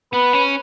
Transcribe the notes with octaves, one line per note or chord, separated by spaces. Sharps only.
B3 B4
C#4